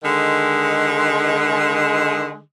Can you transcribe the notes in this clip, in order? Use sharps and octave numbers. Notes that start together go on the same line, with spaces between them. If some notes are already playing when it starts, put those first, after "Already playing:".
D3 D#3 G#3